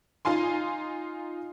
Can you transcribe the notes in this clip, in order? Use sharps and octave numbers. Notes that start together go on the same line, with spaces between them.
D#4 F4 F5 G#5 C6